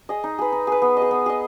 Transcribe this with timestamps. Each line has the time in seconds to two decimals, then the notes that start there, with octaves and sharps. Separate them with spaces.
0.09 G#4 D#5
0.24 D#4
0.39 G#4 B4
0.52 D#4
0.67 G#4 B4
0.82 B3
0.97 D#5
1.02 G#4
1.11 B3
1.26 G#4 D#5